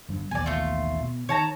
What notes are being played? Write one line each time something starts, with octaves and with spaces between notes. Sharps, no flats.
G1 G2
A1 D#2 B2 D5 G#5
A3 F4
B2
D#3 C#5 A5 A#5